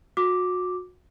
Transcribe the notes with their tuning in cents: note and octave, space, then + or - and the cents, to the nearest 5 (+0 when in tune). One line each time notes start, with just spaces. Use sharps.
F#4 -30 D6 +0